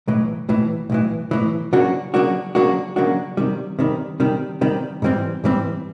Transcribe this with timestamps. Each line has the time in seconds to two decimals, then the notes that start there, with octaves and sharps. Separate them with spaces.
0.08 B1 A2 E3
0.49 B1 A2 E3
0.90 B1 A2 E3
1.31 B1 A2 E3
1.73 C#3 F#3 A#3 D4 F#4
2.14 C#3 F#3 A#3 D4 F#4
2.55 C#3 F#3 A#3 D4 F#4
2.96 C#3 F#3 A#3 D4 F#4
3.37 C3 D#3 G3
3.79 C3 D#3 G3
4.20 C3 D#3 G3
4.61 C3 D#3 G3
5.02 G#2 E3 G3 C4
5.44 G#2 E3 G3 C4